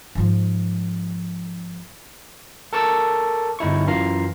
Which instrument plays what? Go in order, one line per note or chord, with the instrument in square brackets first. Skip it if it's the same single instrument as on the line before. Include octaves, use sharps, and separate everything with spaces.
[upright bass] G#2 F3
[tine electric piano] A4 A#4 A5 C#6 D6 E6
G1 D#4 E4 C#6
F#2 E3 F4 F5 A#5 C7